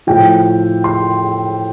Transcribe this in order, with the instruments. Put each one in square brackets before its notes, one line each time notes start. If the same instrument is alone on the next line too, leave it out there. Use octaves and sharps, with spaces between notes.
[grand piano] A2 F3 G5
C6